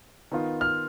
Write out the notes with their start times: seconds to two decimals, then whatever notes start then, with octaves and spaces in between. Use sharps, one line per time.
0.32 D#3 B3 F4
0.61 F6